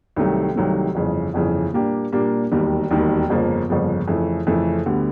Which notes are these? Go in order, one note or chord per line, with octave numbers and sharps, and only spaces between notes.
C2 C3 D#3 F#3 A3
C2 C3 D#3 F#3 A3
G1 F2 C#3 E3
G1 F2 C#3 E3
A#2 G3 A#3 D4 G4
A#2 G3 A#3 D4 G4
E1 D#2 D#3 G3
E1 D#2 D#3 G3
G1 F2 C#3 F3 A#3
G1 F2 C#3 F3 A#3
F2 C#3 E3 A3
F2 C#3 E3 A3
D2 D3 G3 B3